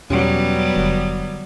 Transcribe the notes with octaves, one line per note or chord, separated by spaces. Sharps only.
E2 B2 F#3 G3 B3 C#4 G4
F1 D3